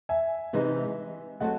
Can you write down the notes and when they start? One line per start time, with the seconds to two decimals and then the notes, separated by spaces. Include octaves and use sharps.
0.09 E5 G#5
0.53 C3 E3 G#3 D#4
1.40 F#3 A3 C4 D#5 F#5